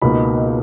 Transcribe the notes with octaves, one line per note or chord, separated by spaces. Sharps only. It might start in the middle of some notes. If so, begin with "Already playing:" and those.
C#2 B2 A#3 D#4 B5